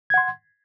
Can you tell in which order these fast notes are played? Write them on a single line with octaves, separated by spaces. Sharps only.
G#6 F#5 C6